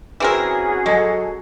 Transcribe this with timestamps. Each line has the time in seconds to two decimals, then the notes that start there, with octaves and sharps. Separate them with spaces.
0.20 E3 C4 C#4 F#4 G#4 A#4
0.86 F#3 G#3 A4 D#5